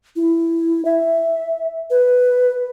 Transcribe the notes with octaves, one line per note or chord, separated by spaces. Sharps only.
E4
E5
B4